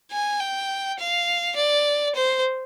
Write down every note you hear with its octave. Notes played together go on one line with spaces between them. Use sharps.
G#5
G5
F5
D5
C5